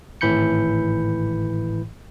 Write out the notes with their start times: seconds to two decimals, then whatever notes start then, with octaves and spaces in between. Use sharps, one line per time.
0.21 G#1 A2 E3 B5 G6 C#7